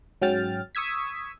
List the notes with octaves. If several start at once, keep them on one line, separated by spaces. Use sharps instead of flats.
G#2 F#3 C#4 G5 F6 A6
C#6 D#6 E6 G#6 B6